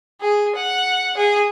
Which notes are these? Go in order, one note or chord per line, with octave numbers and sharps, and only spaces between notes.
G#4
F#5
G#4